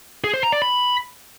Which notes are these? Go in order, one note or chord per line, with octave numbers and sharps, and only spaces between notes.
G#4
C5
A#5
D5
B5